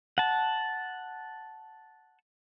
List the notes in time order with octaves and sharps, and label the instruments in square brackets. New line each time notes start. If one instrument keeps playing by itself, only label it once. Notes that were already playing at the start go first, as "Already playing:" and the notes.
[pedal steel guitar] F#5 A5